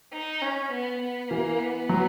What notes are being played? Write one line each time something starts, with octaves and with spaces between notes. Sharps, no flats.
D#4
C#4
B3
B3
E3 A#3
B3
F#3